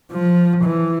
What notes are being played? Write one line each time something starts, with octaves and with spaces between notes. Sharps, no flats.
F3
E3